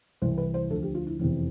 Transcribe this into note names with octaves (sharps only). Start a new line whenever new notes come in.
C2 C3 E3 C5
B4
C5
D2 D3 F3 A4
G4
F4
E4
F1 E2 C3 E3 E4